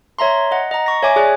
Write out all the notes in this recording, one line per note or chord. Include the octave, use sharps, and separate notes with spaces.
C#5 E5 A#5 C6
D#5 F#5
D#5 A#5
C#6 A#6
C#5 E5 G#5 D6
G#4 C#5 D5 G#5 F#6